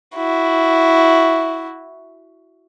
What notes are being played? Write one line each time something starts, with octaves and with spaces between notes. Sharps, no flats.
E4 F#4